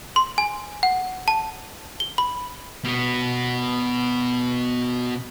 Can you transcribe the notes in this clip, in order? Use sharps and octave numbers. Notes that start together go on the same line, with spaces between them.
C6
G#5
F#5
A5
G7
B5
B2 B3